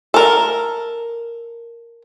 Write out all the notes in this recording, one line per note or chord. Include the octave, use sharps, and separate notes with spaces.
A4 A#4